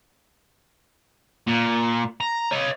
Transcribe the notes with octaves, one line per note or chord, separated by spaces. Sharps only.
A#2
A#5
C#5 D#5